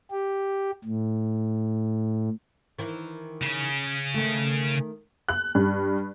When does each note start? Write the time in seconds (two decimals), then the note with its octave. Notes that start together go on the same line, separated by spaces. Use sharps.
0.11 G4
0.85 A2
2.79 D#3 E3
3.42 C#3 C#4
4.14 D#3 A3
5.29 F#6
5.55 G2